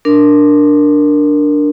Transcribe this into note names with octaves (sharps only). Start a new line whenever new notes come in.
D4 A#4